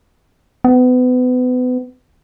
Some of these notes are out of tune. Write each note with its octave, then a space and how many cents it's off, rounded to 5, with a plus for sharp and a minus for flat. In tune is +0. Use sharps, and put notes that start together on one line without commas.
B3 +30